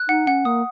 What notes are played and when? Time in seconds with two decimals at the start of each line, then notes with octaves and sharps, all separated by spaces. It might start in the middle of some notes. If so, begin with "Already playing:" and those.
Already playing: F#6
0.08 D#4 F#5
0.27 C#4 F#5
0.45 A#3 D#6